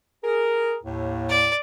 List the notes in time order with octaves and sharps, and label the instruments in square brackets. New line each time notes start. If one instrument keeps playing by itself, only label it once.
[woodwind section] G#4 A#4
D#2 A2
[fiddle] D5